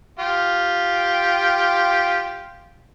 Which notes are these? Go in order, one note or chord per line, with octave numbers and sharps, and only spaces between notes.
F4 G4